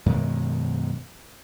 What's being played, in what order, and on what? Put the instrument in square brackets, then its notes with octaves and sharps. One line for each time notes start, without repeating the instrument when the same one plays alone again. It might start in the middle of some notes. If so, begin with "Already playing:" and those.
[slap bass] F#2 B2 D#3 G#3